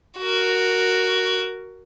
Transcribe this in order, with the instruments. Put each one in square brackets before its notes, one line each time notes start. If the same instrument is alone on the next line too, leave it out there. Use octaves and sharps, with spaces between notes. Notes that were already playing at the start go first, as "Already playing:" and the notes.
[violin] F#4 A#4